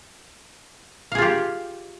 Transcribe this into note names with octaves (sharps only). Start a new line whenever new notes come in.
F4 G4 G#4 F5